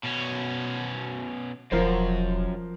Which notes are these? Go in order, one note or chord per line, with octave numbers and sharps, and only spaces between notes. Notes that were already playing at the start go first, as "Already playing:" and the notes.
B2 C#4
E1 F#2 F3 A#4 C5